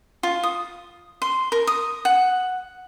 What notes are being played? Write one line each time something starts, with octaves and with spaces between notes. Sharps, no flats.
F4
D#6
C6
A#4
D#6
F#5